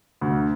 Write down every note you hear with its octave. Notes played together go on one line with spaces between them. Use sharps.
D2